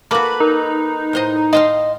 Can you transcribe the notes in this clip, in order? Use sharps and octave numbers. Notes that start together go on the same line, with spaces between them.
A#3 F#4 A4 B4 B5 D6
D#4 A#4
A2 C5 D#5
D#5 F5 G5 A5 C6